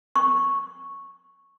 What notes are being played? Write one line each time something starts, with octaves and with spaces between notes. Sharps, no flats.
C#6